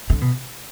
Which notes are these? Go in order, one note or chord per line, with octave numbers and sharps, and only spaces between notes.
D3
B2